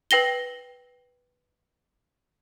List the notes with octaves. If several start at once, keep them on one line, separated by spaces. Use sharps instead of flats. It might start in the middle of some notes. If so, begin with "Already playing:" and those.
B4 G5 A#6 G7